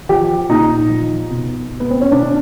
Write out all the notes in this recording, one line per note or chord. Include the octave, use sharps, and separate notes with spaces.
F3 G4
A#2 D#4
F3
B2
B3
C4
C#4
B2 D4